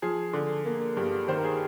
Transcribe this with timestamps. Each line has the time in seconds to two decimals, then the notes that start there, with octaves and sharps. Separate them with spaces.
0.02 F3 G#4
0.33 D3
0.65 A#3
0.97 G2
1.28 D#3 C5
1.37 A#4
1.44 G#4